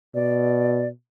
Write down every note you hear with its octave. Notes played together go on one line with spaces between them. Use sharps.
B2 D5